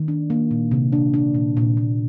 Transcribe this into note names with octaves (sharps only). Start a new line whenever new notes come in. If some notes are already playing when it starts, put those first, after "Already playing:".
Already playing: D#3
D4
A#3
A#2
C3
D4
D4
A#2
A#2
A#2